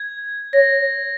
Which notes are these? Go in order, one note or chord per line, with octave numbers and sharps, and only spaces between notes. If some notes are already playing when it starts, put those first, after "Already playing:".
Already playing: G#6
C#5 A#6